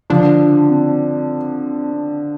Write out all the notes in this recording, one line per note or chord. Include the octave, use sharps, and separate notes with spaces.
D3 F3 D4
C4